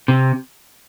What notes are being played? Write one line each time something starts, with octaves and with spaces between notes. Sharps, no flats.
C3